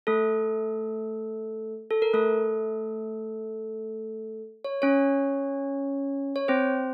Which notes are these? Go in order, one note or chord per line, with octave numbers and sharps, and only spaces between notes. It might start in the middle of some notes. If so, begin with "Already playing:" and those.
A3 A4
A4
A#4
A3 A4
C#5
C#4 C#5
C#5
C4 C5